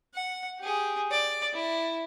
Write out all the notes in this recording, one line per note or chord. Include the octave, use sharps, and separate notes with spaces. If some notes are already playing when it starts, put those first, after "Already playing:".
F#5
G4 G#4
D5
E4